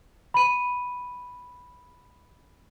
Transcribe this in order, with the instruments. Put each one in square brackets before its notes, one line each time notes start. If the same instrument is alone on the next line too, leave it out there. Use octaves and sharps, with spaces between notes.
[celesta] B5 D#7